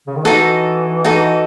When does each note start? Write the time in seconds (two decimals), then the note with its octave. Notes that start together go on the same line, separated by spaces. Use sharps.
0.07 C#3
0.15 D#3
0.24 E3 D#4 F#4 A4 D#5
1.04 D#4 F#4 A4 D#5